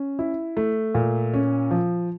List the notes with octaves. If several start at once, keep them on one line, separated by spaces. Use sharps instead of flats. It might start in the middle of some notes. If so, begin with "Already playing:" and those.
Already playing: C#4
E4
A3
A#2
C#4
F3